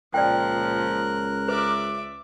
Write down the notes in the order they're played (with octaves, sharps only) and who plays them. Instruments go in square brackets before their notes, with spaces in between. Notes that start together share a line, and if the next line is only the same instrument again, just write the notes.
[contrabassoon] C#2 [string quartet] A#2 F3 [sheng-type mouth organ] A#4 F#6 [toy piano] D5 G5
[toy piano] B4 [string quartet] D5 E5 D6